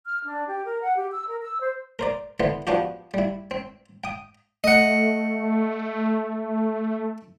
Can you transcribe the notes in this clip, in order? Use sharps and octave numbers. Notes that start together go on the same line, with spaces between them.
F6
D4
G4
A#4
F#5
G4
E6
A#4
E6
C5
A#4 C5 D5
D3 E3 B3 C5
F3 B3 D4 F#4 G4
G3 E4
C4
G5 D#6
A3 D#5 F#5